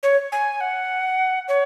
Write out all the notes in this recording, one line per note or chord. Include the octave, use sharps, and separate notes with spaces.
C#5
G#5
F#5
C#5